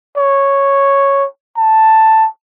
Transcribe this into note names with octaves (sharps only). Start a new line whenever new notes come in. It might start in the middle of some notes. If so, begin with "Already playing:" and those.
C#5
A5